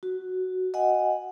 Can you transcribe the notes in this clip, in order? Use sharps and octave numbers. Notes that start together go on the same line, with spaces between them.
F#4
D#5 F#5 G#5